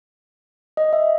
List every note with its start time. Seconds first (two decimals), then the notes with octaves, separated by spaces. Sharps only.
0.77 D#5
0.93 E5